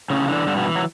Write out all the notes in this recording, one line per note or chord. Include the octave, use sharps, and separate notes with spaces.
A2 C#3 C#4
D3 E3 D4
G2 D3 D4
B2 B3
E3
F#3